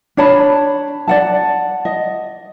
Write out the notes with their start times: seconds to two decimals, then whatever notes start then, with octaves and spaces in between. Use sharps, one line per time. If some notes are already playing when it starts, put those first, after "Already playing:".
0.17 D4 C#5 A5 B5
1.08 D5 F#5 A5
1.85 D#5